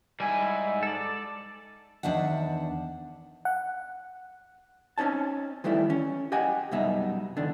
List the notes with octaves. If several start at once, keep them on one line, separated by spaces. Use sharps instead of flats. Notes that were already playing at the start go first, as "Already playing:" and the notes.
G#2 G3 E4 G#5
A4 D5
E2 D#3 D4 E5 F#5
F#5
C4 C#4 D#4 C#5 A5
D#3 E3 G3 A3 E4
C#4
G4 D#5 F#5 G#5
C2 F#2 B2 G3 D#4 E5
E2 D3 D#3 D4